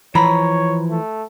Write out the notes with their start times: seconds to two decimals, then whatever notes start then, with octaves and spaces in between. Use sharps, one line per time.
0.15 E3 F3 C#5 A#5 B5
0.90 A3